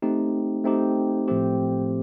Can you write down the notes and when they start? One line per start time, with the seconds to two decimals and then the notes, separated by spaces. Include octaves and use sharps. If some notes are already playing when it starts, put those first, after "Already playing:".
0.02 A3 C4 D#4 G4
0.64 A3 C4 D#4 G4
1.28 A2 F3 A3 C4 G4